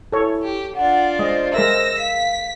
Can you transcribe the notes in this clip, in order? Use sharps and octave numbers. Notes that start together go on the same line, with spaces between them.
E4 A4 C#5
G4
D4 F4 F#5
G#3 C5 D#5
G#3 A#4 E5 E6 A#6
F5 B6